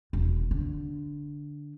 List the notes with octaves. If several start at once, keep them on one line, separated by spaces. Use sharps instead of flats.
E1
D3